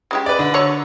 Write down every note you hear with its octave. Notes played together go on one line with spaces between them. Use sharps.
C#3 G#3 G4
B4 D5
D3
F#3 C#5